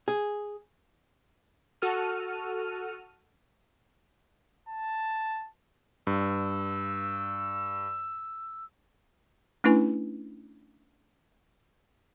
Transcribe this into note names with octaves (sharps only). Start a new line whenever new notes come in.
G#4
F#4 A4 F6 D#7
A5
G2 E6
A3 C#4 D4 E4 B4 G#5